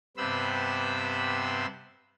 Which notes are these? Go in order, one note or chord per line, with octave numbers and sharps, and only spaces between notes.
G2 C3 B3 C5 B5 E6